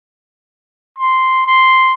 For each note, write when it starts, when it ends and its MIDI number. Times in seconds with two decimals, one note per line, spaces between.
0.99 1.43 84
1.47 1.92 84